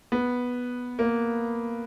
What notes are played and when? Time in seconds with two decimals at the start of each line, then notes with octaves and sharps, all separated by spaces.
0.12 B3
0.99 A#3